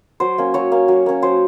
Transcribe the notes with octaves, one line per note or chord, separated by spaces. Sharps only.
F#3 C5
A#3 C#4
F#3 C#5
A#3 C#4
F#3
A#3 C#4
F#3 C5